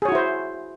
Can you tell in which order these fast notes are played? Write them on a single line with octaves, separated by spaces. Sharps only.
G#4 C#5 F#4 E4 C5